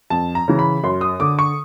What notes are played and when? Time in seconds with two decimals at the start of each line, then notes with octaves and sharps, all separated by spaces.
0.10 F2 A5
0.35 A#5
0.48 C#3 E3
0.59 B5
0.84 F#2 C6
1.01 D#6
1.20 D3 D6
1.39 C#6